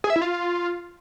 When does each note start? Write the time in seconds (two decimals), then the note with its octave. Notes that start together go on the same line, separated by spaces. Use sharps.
0.04 G#4
0.10 E5
0.16 E4
0.22 F4